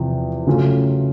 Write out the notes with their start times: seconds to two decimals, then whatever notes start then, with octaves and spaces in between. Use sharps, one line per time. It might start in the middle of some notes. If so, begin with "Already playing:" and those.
Already playing: E2 C3 F3
0.46 C#3 F#3 A3 C#4 F4